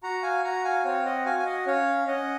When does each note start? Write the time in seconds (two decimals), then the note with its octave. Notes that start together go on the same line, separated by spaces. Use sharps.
0.03 F#4 F#5 A#5
0.23 F5 G#5
0.43 F#4 F#5 A#5
0.64 F5 G#5
0.85 C4 C#5 F5
1.05 D#5 F#5
1.25 F#4 F5 G#5
1.39 F5
1.46 D#5 F#5
1.66 C#4 C#5 F5
2.07 C#4 D#5 F#5